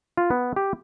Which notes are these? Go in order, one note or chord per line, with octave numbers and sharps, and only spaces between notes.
F4
B3
G4